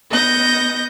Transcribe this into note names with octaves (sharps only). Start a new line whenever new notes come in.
B3 D#5 G6 A#6